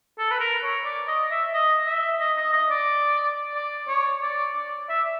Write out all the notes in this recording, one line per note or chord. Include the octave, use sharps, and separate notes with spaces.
A4
B4
A#4
C#5
D5
D#5
E5
D#5
E5
D#5
D#5
D#5
D5
D5
C#5
D5
D5
E5